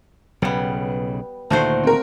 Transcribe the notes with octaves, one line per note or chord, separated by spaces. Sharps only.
B1 C#3 G3 B3
D2 A#2 D#3 A3 F#4 C5
C4 A#4